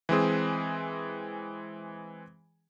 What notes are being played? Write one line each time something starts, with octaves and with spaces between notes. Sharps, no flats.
E3 G#3 C4 G#4